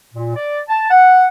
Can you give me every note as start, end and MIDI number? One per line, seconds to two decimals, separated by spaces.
0.14 0.32 46
0.36 0.59 74
0.69 0.88 81
0.91 1.27 78